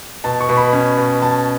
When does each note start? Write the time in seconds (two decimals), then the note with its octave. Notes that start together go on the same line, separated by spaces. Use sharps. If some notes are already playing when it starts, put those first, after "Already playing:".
0.24 B2 A5
0.41 C#6
0.49 B2
0.57 B5
0.73 C#4
0.97 B2
1.22 C#4 A5